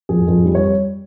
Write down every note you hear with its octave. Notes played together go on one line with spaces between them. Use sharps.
F2 G#4
F2
G3
C#5